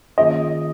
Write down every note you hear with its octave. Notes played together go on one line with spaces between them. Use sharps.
D#3 A#3 C#4 F4 G#4 D#5